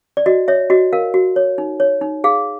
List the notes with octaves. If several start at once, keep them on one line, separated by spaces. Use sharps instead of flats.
D5
F#4 D#5
C#5 E5
F#4 D#5
A#4 F5
F#4
C#5
D#4
C#5
D#4
G#4 F5